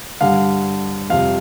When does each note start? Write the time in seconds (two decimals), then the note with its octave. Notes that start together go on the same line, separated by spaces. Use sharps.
0.21 G2 D3 G3 F5
1.10 F2 C3 G3 F5